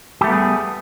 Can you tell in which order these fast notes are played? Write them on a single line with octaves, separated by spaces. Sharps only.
G4 A3 B3 G3 G#4